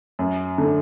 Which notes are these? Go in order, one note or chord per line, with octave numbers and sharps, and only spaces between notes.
F#2
D3